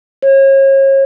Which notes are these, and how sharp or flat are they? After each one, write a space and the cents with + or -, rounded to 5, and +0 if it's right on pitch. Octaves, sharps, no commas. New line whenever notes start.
C#5 -35